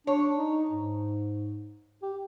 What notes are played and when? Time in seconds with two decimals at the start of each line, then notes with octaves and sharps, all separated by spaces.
0.07 D4 C#5
0.36 D#4
0.71 G#2
2.03 G4